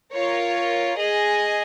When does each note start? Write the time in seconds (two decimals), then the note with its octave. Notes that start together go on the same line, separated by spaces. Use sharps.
0.12 F4 A#4 C#5
0.97 G#4 D#5 G#5